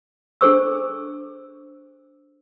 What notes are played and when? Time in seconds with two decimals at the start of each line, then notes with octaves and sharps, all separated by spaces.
0.41 D4 G#4 A4 C5 C#6 E6